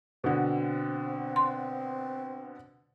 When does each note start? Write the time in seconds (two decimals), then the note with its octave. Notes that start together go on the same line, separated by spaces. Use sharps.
0.24 B2 D3 C4
1.36 C6